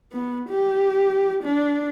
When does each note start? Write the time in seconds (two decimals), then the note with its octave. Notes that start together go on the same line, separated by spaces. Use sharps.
0.12 B3
0.49 G4
1.44 D4